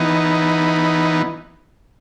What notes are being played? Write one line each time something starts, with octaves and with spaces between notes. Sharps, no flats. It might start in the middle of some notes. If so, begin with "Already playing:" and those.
Already playing: E3 B3 D#4